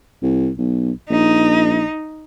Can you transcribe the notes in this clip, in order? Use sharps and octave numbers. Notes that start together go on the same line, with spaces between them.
C2
B1
A#1 D#4